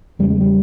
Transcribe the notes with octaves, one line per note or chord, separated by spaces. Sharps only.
E2 C#3 G3
G#3
G3